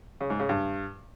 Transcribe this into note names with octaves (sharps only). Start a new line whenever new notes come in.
C#3
G#2
C#3
G2